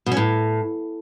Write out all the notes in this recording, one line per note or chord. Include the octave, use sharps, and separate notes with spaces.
B2
C#4
A2